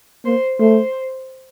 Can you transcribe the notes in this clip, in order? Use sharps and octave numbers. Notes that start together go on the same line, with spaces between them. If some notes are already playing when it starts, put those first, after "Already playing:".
A#3 C5
A3 C5